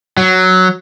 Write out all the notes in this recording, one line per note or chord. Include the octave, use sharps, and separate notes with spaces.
F#3